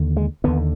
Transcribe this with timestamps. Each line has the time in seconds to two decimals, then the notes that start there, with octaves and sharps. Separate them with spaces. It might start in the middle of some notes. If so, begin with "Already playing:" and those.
Already playing: D#2 D3
0.17 G#3
0.44 D#2 D3 B3